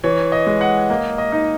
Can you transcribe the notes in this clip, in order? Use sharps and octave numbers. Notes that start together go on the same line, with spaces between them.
E3 C#5
D#5
G#3
F#5
A#3 D#5
D#5
D#4